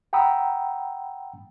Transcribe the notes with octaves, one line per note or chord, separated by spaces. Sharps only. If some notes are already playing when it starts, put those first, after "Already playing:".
F#5 G5 A#5 B5 D#6 E6